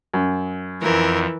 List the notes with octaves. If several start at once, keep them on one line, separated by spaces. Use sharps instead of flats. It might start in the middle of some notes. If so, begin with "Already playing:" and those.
F#2
F2 E3 A#4